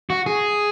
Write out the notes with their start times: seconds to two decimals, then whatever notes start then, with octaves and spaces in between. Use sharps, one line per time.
0.10 F#4
0.26 G#4